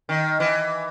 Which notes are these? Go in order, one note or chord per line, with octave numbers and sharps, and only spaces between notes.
D#3
E3